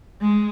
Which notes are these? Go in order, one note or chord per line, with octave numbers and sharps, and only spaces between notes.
G#3